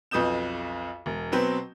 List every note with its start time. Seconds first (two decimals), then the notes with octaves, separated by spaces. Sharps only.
0.11 B1 F2 B4 D#6 G6 E7
1.06 E1
1.32 B2 F#3 C4 B4 G6